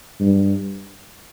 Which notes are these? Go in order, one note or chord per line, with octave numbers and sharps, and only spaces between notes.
G2